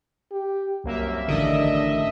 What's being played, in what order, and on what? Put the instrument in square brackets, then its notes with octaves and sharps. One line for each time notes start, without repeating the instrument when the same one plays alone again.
[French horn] G4
[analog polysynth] C2 A#3 E5 [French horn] F#2
[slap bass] A1 D3 D#3 [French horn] D4 [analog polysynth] D#5 E5